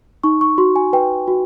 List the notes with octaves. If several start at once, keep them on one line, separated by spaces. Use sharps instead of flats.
D#4 C#6
C#6
F#4 C6
G#5
B4 G5
F#4